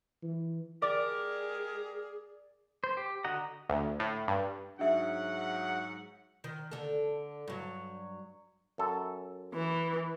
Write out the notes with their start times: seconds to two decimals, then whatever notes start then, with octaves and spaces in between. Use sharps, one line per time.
0.22 E3
0.82 G#3 G4 G#4 A#4 D5 D6
2.84 C5
2.97 G4
3.24 D3 F#4 D#5 F#5 A#5
3.69 D2
3.99 A2
4.28 G2
4.79 G#2 F#3 D4 E5 F#5
6.44 D#3
6.71 D3 A4
7.48 G2 F#3
8.78 F#2 A4
9.54 E3